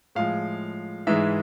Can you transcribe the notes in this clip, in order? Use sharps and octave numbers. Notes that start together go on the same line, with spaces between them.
A2 F3 G#3 F5
G#2 E3 G#3 E5